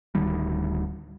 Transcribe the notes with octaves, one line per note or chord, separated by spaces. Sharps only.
D1 D2 D#3 G3